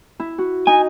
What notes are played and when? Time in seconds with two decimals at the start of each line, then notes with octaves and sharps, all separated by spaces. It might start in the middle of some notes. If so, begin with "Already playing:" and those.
0.20 E4
0.38 F#4
0.67 D#4 G#5